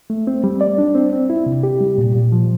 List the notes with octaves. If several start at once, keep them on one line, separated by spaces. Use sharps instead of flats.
A3
C4
G3
D5
D4
C4
C4
E4
C3
G4
G3
A#2
A#2
F3